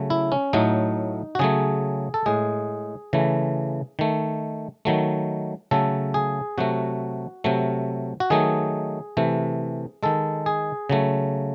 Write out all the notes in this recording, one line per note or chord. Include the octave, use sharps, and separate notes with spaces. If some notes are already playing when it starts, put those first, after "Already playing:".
Already playing: C#3 F#3 A3
E4
C#4
A2 F#3 A3 D#4
F#4
C#3 F#3 A3 G#4
A4
A2 G#3 G#4
C#3 E3 A3
D#3 A3
D#3 F#3 A3
C#3 F#3 A3 A4
G#4
C3 F#3 A3 F#4
C3 F#3 A3
F#4
D#3 F#3 A3 G#4
C3 E3 A3
D#3 G#3 A4
G#4
C#3 F#3 A3